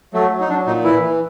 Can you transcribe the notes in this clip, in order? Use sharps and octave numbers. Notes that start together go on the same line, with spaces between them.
F#3 A3
F#3
D#4
F#3 D4
A#2 D#4
E3 E4
E3